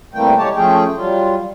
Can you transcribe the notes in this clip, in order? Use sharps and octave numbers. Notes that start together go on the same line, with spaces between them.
C3 E3 G3 A3 A#3 G5
G#3 G4 C#5 A5
F3 A3 C#4 G#4 G5
F#3 G3 F4